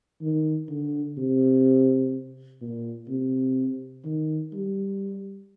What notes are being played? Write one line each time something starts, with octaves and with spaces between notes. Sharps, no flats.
D#3
D3
C3
A#2
C3
D#3
G3